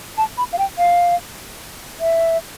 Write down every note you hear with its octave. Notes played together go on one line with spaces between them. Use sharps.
A5
B5
F5
G5
F5
E5